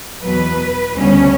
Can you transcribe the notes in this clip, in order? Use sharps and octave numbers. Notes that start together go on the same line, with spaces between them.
E2 B2 F#3 B4
D2 C#3 G3 B3 C#4